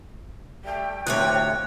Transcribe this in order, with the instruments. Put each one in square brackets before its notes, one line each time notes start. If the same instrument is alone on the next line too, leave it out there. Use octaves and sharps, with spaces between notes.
[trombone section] G3 A3 [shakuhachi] G5
[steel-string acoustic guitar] D2 A2 C#5 [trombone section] C3 F3 [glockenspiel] F#6